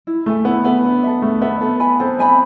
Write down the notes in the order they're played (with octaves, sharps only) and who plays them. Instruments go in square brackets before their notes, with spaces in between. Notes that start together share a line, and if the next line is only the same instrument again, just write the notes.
[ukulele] E4
[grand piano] A3 [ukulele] A4 E5 G#5
[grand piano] B3 [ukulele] E4
[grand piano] B3 [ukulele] A4 E5 G#5
[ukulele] D4
A4 E5
[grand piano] A3 [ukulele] D4
[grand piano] B3 [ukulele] A4 E5
[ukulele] A4
E5 G#5 B5
[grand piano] C4 [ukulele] A4
[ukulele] E5 G#5 B5